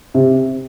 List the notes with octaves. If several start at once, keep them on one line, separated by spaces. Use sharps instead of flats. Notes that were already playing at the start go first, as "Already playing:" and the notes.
C3